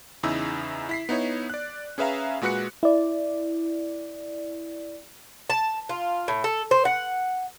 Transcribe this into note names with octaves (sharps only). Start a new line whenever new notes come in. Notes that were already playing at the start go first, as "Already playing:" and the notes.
E2 C#3 D#4 E4 E6
E4 B6 C7
B3 D#4 E4 C#5
D5 F#6
C#4 G#4 B4 E5 F5 A#5
A#2 G#3 F#4 B4 F#6 C#7
E4 D5
A5
F4
A2
A4
C5
F#5